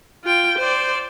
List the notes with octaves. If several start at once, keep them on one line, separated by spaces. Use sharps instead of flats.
F4 G5
C5 D5